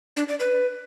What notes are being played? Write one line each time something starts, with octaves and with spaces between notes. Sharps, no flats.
D4
D5
B4